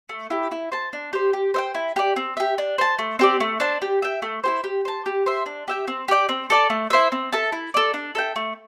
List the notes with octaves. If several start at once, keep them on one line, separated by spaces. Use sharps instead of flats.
A3
E4 G4
E4
C5 A5
D4
G4 C5
G4
C5 E5 G5
E4
G4 D5
C4
G4 E5
D4
C5 A5
A3
C4 G4 D5
A3
D4 C5 A5
G4
E5 G5
A3
E4 G4 C5
G4
C5 A5
G4
C5 E5
D4
G4 E5 G5
C4
G4 D5 G5
C4
A4 D5 A5
A3
E4 C5 E5
C4
A4 E5 A5
E4
A4 D5
D4
A4 E5 G5
A3